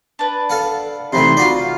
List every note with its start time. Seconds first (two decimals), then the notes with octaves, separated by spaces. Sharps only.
0.19 D4 B4
0.50 A4 F5 F#5
1.13 C3 E3 A3 D#4 B5 C6
1.37 F4 F#4 D5
1.60 F5